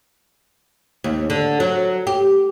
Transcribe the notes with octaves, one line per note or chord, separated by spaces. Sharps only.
D#2
D3
F#3
G4